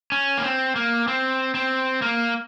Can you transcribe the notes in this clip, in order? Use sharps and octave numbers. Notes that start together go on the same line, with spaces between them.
C#4
A#3
C4
A#3
C4
C4
A#3